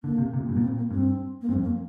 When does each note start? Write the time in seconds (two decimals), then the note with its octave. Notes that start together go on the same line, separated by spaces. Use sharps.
0.04 D3 A#3
0.18 C3
0.33 C3
0.40 A#2
0.49 G2
0.51 A#3
0.57 A#2
0.62 C4
0.77 A#3
0.91 G2 C4
1.42 A#3
1.48 G2 C4
1.56 F2
1.63 A#3